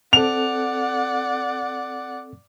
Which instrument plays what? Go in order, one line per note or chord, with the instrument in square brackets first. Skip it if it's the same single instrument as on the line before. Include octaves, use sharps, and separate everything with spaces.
[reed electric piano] C4 A4 [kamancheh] D5 F#5 [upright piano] F7